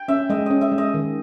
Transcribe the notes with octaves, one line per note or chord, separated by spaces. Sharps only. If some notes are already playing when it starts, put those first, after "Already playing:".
Already playing: G5
C#4 E5
G#3 D#5
C#4 D#5
E5
G#3
D#5
D#3